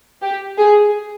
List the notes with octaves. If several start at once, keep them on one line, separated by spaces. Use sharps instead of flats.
G4
G#4